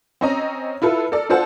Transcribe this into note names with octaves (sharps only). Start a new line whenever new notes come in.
C4 C#4 D#5 A#5
E4 F4 A4 B4
A4 A#4 D5
D4 F4 A4 C5 F#5 A5